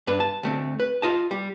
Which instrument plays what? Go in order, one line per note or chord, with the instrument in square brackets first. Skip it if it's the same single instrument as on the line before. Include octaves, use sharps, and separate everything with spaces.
[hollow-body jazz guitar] G2 D4 B4
A5
D2 A3 C4
B4
F4 D#5 A5
G3